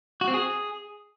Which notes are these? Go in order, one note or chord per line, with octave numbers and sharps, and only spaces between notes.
F#4
C4
G#4